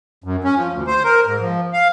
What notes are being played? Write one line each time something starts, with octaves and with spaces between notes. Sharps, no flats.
F#2
C#4
F3
D2
C5
A#4
G#2
F3
F5